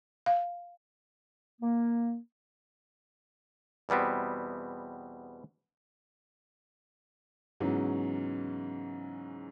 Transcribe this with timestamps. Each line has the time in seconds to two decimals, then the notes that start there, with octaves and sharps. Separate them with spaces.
0.26 F5
1.61 A#3
3.89 E2 B2 G3 B3 C4
7.60 G#2 C#3 E3 F#3 B3 C#4